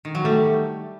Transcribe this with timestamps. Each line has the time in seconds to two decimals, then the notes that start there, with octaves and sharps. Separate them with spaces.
0.05 D#3
0.15 F#3
0.24 G3 A3